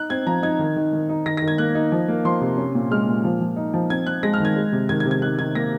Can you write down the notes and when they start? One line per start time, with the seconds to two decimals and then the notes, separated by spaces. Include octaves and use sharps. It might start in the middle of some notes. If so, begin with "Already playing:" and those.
Already playing: D#4 F#6
0.10 C4 G#6
0.27 F3 A#5
0.43 D#4 G#6
0.59 D#3
0.76 D#3
0.93 D#3
1.09 D#4
1.26 D#3 A#6
1.37 D#3 A#6
1.48 G#6
1.58 A#3 F#6
1.75 D#4
1.92 F3
2.08 A#3
2.25 F3 C6
2.41 C3
2.57 C#4
2.75 A#2
2.91 G#3 F6
3.08 A#2
3.24 F3
3.41 F3
3.56 D#4
3.74 F3
3.90 C4 G#6
4.06 C4 F#6
4.23 G#3 A#6
4.34 F6
4.40 D#3 G#6
4.56 G#3
4.72 C3
4.89 D#3 G#6
5.00 G#6
5.06 C3
5.11 G#6
5.22 D#3 F#6
5.39 D#3 G#6
5.55 A#3 A#6